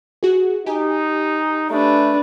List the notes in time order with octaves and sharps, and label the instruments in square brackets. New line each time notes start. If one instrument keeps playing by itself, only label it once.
[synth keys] F#4 G#4
[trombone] D#4 [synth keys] G4 G#5
[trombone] A3 [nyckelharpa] D4 B4